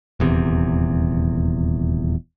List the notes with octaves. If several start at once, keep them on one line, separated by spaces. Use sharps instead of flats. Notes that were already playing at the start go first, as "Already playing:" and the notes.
D#1 E2 C3